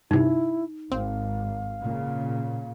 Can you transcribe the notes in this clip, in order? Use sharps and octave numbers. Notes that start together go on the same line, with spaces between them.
G2 C3 D#4 E4
G#1 C4 F5
A#2 C#3